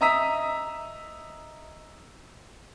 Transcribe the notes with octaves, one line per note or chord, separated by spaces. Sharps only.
D#5 E5 A#5 D#6 E6 B6